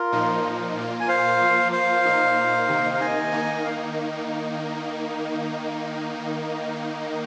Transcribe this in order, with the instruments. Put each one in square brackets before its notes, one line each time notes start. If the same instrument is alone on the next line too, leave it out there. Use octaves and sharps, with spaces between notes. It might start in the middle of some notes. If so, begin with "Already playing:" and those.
Already playing: [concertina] F4 A#4
[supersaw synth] A#2 F3 A#3 D#4
A#2 A#3 F4
[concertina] G#5
C5 F5
[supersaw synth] F3 A#3 F4
[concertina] C5 F5
[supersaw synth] A#2 A#3 D#4
C3 D#3 A#3 D#4
[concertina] F5
D#5 G#5
[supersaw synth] D#3 A#3 D#4
[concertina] F5